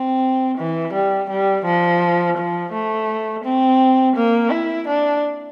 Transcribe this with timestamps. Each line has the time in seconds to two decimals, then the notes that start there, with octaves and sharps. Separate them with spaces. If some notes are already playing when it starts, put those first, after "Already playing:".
Already playing: C4
0.57 E3
0.93 G3
1.30 G3
1.65 F3
2.36 F3
2.72 A3
3.44 C4
4.15 A#3
4.50 E4
4.87 D4